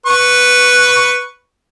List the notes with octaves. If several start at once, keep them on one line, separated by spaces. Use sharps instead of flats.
B4 C#6